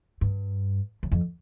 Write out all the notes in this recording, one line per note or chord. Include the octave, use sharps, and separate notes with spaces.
G2
F#2
F2